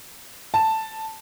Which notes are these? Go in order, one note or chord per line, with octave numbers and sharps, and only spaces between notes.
A5